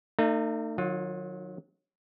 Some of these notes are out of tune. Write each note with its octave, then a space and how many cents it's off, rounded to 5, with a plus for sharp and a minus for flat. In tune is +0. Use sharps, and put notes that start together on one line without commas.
A3 +40 D#4 -30
D#3 -30 F#3 -20 F4 +20